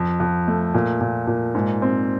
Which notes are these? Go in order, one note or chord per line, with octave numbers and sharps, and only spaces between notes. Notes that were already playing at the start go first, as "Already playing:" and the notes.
Already playing: F2
F2
A3
A#2
A#2
A#2
G#2
C4